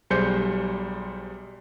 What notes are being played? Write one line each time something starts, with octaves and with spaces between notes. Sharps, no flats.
B1 G3 G#4 C5 G6 C#7